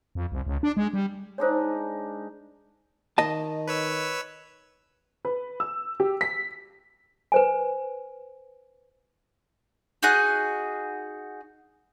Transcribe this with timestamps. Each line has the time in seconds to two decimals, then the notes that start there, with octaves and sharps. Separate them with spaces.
0.15 F2
0.32 C2
0.47 C#2
0.63 D4
0.77 G#3
0.93 G3
1.38 G#3 D4 D#4 C5 C#5
3.18 D#3 D#5 A5
3.67 B4 C#5 E6
5.25 B4
5.60 E6
6.00 G4
6.21 B6
7.32 B4 C5 G#5
10.03 D#4 F#4 G#4 F#6